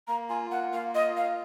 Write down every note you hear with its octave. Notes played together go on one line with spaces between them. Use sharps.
A#3 A#5
F4 G#5
A#3 F#5
A#3 F5
F4 D#5
A#3 F5